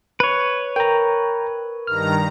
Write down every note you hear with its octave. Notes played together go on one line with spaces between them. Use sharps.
B4 C#5
A#4 G5 A#5
G2 D#3 A#5 F6